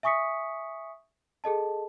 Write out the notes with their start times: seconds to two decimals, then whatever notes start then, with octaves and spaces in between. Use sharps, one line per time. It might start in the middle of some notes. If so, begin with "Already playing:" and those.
0.03 E5 G#5 C#6 D#6 B6 C#7
1.44 G#4 A4 D#5 A5